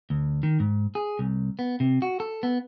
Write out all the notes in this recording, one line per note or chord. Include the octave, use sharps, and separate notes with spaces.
D2
D#3
G#2
G#4
C2
B3
C3
F#4
A4
B3